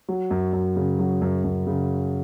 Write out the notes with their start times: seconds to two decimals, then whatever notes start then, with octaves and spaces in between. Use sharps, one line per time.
0.08 F#3
0.31 F#2
0.53 F#2
0.76 C#3
0.99 F#3
1.22 F#2
1.44 F#2
1.67 C#3